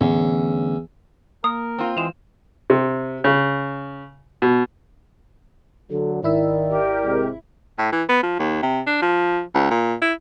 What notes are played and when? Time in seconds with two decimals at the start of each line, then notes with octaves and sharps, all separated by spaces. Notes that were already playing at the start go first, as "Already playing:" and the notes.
0.01 E2 A2 D3 C#4
1.44 A#3 A#4 D#6
1.79 C4 F4
1.97 E3 G#3 E7 F7
2.70 C3
3.24 C#3
4.42 B2
5.90 D3 F#3 A4
6.23 G#1 D#3 E4 D5 E5
6.68 G4 A#4
7.04 C3 G#3 C4
7.78 A2
7.92 E3
8.09 B3
8.23 F3
8.39 D#2
8.62 C3
8.87 D4
9.02 F3
9.54 C#2
9.70 A#2
10.02 E4